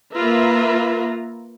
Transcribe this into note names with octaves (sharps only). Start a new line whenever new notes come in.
A#3 F4 B4 E5 A#5